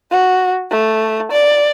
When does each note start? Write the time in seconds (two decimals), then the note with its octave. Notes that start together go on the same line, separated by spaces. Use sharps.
0.11 F#4
0.71 A3
1.32 D5